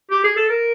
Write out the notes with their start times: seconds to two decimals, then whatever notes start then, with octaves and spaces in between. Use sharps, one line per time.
0.11 G4
0.24 G#4
0.36 A4
0.50 A#4